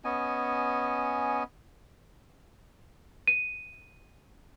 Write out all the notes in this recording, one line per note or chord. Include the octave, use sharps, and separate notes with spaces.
B3 C#4 D#5 G#5
D#7